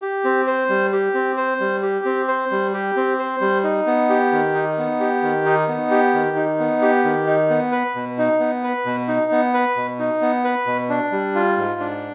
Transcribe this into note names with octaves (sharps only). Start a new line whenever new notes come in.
G4
C4
C5
G3
G4
C4
C5
G3
G4
C4
C5
G3
G4
C4
C5
G3
D#4
B3
G4
D#3
D#4
B3
G4
D#3
D#4
B3
G4
D#3
D#4
B3
G4
D#3
D#4
B3
B4
B2
D#4
B3
B4
B2
D#4
B3
B4
B2
D#4
B3
B4
B2
D4
G3
F4
G#2
D4